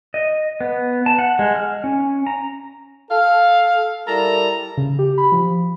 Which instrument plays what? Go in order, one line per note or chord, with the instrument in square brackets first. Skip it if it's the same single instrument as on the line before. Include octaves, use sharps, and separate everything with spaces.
[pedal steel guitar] D#5
B3
A5
F#5
G#3
F6
C#4
A#5
[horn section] A4 F5
G3 E4 A4 A#4 A#5
[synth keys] C#3
G4
B5
F3